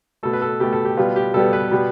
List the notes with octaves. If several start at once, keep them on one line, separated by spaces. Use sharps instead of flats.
B2 A3 A4
B4
A4
B2 A3 G4
A4
G4
B2 G3 B3 F4
G4
B2 G3 B3 A4
B4
B2 G3 B3